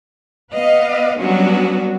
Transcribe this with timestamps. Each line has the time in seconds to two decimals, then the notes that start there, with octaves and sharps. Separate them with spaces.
0.52 B3 B4 D#5 F5
1.18 F#3 G3 B3 C#4 D4 F#4